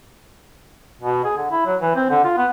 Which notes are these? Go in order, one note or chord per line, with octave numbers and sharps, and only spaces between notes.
B2
G#4
D3
E4
F#3
E3
C4
D3
F4
B3